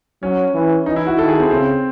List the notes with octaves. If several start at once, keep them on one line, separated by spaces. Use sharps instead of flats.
F#3 C#4
E3
E3 D#4
E4
F#4
D#3 A4
G#4
C4
C#3 C4